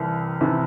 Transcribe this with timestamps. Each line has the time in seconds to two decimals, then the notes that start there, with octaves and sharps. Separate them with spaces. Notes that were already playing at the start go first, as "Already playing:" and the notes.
Already playing: C2 C3 E3
0.41 C3 E3